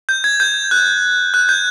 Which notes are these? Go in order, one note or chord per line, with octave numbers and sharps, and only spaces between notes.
G6
G#6
G6
F#6
F#6
G6